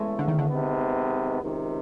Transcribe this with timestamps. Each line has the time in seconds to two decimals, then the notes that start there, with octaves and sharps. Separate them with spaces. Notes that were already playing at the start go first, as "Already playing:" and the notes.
Already playing: E2 C#3 E3 G#3 A3
0.19 D3
0.28 D#3
0.39 D3
0.50 C3 D#3 G#3 B3
1.41 C#2 C3 D#3